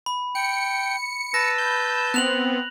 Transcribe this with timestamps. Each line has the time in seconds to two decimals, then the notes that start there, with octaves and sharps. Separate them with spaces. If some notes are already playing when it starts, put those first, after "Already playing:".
0.06 B5
0.35 G5 C#7
1.34 B4 A5 E6 A#6
1.58 G6
2.14 B3 C4 F#6 F7 F#7